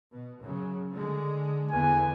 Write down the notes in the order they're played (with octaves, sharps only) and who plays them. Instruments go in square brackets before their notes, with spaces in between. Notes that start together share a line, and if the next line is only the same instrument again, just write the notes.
[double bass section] B2
F#2 C#3 F#3
D3 G#3
[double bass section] E2 D3 E3 [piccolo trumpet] G#5